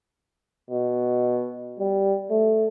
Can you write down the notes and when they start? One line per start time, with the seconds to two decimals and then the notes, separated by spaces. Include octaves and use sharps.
0.70 B2
1.79 G3
2.31 A3